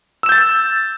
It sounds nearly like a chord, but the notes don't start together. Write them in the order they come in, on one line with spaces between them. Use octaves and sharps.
E6 E7 G6 A6